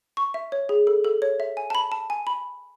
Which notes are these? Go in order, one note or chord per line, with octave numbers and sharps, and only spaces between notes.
C#6
E5
C#5
G#4
A4
A4
C#5
E5
G#5
A5
B5
A5
G#5
B5